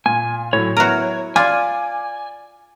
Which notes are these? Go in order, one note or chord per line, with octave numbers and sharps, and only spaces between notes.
A#2 G#5
A2 F#3 C#5
F#3 B3 E4 F#4 A#4
F4 D5 G#5 D6